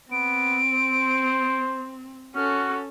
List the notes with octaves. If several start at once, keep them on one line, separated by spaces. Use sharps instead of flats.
B3 C4 D7
C5
C#4 F#4 A4 F6